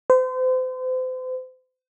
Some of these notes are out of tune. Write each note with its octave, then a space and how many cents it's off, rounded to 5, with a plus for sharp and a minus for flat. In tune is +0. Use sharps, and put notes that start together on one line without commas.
C5 -35